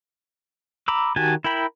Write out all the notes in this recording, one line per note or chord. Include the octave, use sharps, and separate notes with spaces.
A#5 B5 D6 E6
D#3 F#4 G4 G#5 A5
E4 A#4 G5 B5